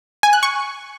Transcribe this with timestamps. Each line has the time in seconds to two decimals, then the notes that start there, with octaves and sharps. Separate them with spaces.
0.23 G#5
0.33 F#6
0.43 C#6